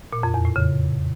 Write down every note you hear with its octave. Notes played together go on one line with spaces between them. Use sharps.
A#2
F2
E2
A2
C#3